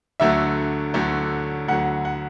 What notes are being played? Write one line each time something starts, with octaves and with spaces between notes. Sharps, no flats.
D2 D3 F#3 A3 E5
D2 D3 F#3 A3
D2 D3 F#3 F#5
F#5